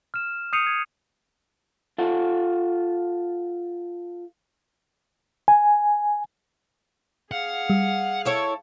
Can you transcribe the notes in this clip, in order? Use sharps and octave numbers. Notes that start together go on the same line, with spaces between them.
F6 E7
D#6 G6 C7 C#7 D#7 F7
G#6
F4 A4 F#5
G#5
G#4 F5 F#5
G3
E4 A4 C#5